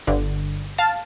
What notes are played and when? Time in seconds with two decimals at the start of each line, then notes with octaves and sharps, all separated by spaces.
0.07 G1 G2 D3
0.78 F5 A5